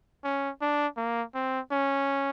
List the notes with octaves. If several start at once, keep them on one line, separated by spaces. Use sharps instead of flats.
C#4
D4
A#3
C4
C#4